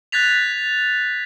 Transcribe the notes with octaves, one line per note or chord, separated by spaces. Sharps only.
F#6 G#6 A6 B6 F7